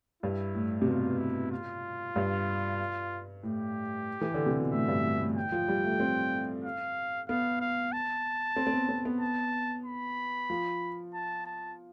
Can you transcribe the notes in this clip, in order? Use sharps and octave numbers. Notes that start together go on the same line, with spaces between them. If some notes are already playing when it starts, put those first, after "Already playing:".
G2 E4
A2
C3
B2 F4
E4
F4
G2
A2 G4
E3
D3
C3
B2
A2 E5
G2
A2
A2
A2 G5
F3
G3
A3
C4
F5
B3 F5
F5
A5
C4
C4
B3
C4
B3
A5
B5
F3
A5
A5